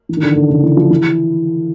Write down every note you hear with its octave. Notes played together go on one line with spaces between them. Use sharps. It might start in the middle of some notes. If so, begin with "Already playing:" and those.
E3
D#3
D3
D3
C#3
E3
F3
E3